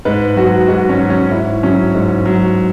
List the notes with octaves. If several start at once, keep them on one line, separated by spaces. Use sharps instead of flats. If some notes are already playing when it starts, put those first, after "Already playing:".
G#2 B4
F#3 F#4
G#2 F#4
C#4
F#3
C#4
G#2 E4
F#3 C#4
G#2
F#3